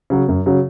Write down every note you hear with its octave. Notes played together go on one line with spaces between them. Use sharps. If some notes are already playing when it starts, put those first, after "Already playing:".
C#3 F#3
F#2
C#3 F#3